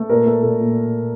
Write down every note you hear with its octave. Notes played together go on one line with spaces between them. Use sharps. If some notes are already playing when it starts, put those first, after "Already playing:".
Already playing: A3
A#2 A#4
A3 A4
A#2 A4
A#2